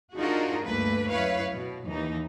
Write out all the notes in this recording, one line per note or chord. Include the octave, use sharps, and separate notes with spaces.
D4 D#4 F4 F#4 G#4 A#4
D2 G2 A3 A#3 B4
F#2 E4 B4 C#5 F5
B2
D#2 E3 D#4